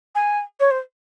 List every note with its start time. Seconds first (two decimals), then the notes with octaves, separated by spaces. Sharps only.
0.15 G#5
0.60 C#5
0.71 C5